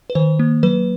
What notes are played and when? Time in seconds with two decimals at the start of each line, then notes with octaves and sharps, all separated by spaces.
0.10 B4
0.15 D#3 C5
0.39 A#3
0.63 F#3 B4